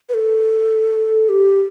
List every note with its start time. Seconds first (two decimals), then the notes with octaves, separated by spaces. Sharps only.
0.09 B4
0.14 A4
1.29 G4